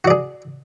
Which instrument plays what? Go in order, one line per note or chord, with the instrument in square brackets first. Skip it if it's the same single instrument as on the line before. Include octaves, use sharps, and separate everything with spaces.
[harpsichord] F#4
D5
G#4